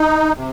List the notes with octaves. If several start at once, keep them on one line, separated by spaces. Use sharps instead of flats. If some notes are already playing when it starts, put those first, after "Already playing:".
Already playing: D#4
C3